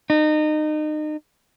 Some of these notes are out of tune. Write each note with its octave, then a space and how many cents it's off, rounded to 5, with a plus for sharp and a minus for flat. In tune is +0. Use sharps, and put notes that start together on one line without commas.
D#4 -30